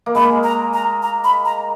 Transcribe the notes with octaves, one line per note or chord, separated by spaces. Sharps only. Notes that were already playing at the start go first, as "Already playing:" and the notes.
A#3
G#3 B5
A#5
A#5
A#5
B5
A#5